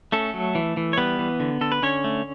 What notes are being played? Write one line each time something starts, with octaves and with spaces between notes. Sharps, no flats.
A3 C#4 A4
F#3
E3
E3
C#5
G3 B3 B4
E3
D3
D3 A4
B4
D3 C#4 C#5
A3